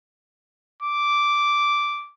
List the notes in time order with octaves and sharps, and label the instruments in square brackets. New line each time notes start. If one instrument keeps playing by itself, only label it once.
[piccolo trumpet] D6